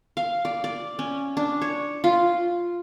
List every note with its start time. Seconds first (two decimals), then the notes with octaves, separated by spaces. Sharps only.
0.17 F5
0.45 D5
0.64 D5
0.99 C#4
1.37 D4
1.62 C#5
2.04 F4